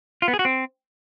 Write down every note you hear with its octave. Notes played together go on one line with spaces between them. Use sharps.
F4
B3
G#4
F#4
C4